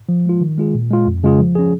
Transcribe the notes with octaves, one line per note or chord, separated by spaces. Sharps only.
F3
G#3 F4
D#3
G#3 F4 G#4
A#2
G#3 F4
F2
C#3 G#3 F4 G#4
F3
C#4 G#4